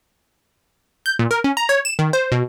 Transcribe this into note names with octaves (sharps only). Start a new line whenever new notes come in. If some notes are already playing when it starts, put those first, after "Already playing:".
G6
A#2
A#4
C#4
A#5
C#5
E7
D#3
C5
B2